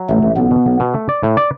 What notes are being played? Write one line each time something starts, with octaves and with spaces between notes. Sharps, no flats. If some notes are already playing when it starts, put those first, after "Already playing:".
Already playing: F#3
A1 A3
A1
B1 B3
B2
B1
B2
A3
D5
A2
D5